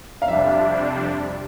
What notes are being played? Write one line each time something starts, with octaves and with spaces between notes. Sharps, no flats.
F5
F2 C3 G3 D4 E5